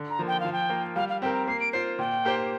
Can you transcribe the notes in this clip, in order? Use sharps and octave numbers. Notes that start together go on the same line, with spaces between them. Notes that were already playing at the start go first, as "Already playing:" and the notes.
Already playing: D3
A#5
F3 A#3
G5
F3 F5
G5
A#3 F4 A#4
G3 F5
F5
C4 G4 A#4 G5
A#5
A#3 C7
D7
F4 C5 C7
A#2 G5
A#3 G4 C5